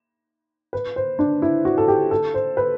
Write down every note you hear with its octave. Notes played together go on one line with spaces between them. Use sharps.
B4
C5
D4
E4
F#4
A4
G4
A4
C5
B4